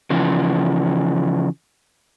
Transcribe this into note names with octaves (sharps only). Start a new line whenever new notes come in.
C#3 E3 F3